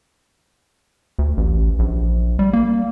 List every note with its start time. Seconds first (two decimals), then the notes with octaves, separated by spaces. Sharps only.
1.19 D2
1.37 A1
1.79 A#1
2.39 G3
2.53 A#3